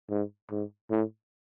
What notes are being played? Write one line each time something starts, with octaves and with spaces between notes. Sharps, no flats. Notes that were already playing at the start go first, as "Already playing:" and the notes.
G#2
G#2
A2